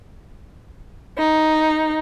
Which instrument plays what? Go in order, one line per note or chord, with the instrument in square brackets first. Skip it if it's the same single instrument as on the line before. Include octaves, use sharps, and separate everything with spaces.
[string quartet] D#4